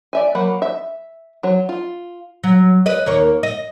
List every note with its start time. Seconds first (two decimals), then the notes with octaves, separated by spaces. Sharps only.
0.13 D5 E5 G#5
0.35 F#3 A#3 F#4 F#5 B5
0.62 E5
1.43 F#3 C#5
1.69 F4
2.44 F#3
2.86 B4 D#5
3.06 D#2 A#3 C#5
3.43 D#5